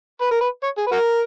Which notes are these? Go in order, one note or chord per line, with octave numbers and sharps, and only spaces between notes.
B4
A#4
B4
C#5
G#4
B4
F#4 A#4